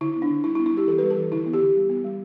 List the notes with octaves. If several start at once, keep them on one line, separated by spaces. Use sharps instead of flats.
D3 E4
B3
D4
D3
G3 E4
E4
B3
E4
G3 G4
E3 A4
G3 B4
A4
E3
D3 E4
B3
G4
D3
G3
B3
G3